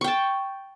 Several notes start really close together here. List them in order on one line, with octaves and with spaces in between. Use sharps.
C#6 G5 A5